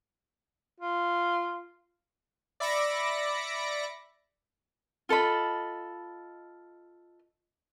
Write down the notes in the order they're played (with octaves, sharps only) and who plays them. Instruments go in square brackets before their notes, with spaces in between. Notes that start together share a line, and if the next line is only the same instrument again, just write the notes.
[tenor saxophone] F4
[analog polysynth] D5 E5 B5 D6 A#6 C#7
[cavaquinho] F4 A4 D#5 B5